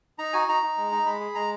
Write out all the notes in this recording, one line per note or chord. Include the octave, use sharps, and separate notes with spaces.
D#4 A#5
F#4 G#5
D#4 A#5
D#4
G#3
D#4
G#3 B5
G#4
G#3 A#5